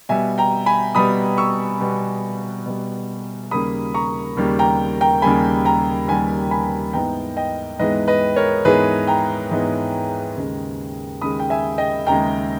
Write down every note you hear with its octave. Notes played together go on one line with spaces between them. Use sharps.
B2 G3 B3 E5 G#5
G5 A#5
G#5 B5
B2 G3 B3 B5 D#6
C#6 E6
B2 G3 B3
B2 G3 B3
D#2 C#3 G3 A#3 B5 D#6
A#5 C#6
D#2 C#3 G3 A#3
G5 A#5
G5 A#5
D#2 C#3 G3 A#3 G#5 B5
G5 A#5
D#2 C#3 G3 A#3 G#5 B5
G#5 B5
G#2 E3 G#3 B3 G5 A#5
D#5 G5
G#2 E3 G#3 B3 B4 D#5
B4 D#5
A#4 C#5
G#2 E3 G#3 B3 G#4 B4
G5 A#5
G#2 E3 G#3 B3
D#2 C#3 G#3
D#2 C#3 G#3 B5 D#6
G5
E5 G#5
D#5 G5
D#2 C#3 G#3 G5 A#5